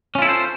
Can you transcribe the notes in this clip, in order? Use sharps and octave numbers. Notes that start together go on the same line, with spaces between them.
C#4 E4 F4 A4 C5